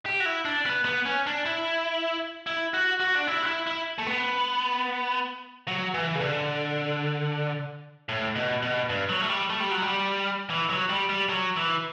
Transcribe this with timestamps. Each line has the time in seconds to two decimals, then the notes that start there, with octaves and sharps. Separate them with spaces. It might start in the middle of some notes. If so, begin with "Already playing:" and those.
0.06 G4
0.20 F#4
0.26 E4
0.45 D4
0.66 B3
0.85 B3
1.06 C#4
1.27 D4
1.46 E4
2.47 E4
2.74 F#4
3.00 F#4
3.15 D4
3.27 E4
3.43 F#4
3.46 E4
3.67 E4
3.98 A3
4.06 B3
5.68 F#3
5.94 E3
6.15 C#3
6.21 D3
8.09 A2
8.35 B2
8.62 B2
8.89 G2
9.09 F#3
9.21 A3
9.29 G3
9.50 A3
9.60 G3
9.71 F#3
9.82 G3
10.50 E3
10.70 F#3
10.89 G3
11.09 G3
11.29 F#3
11.57 E3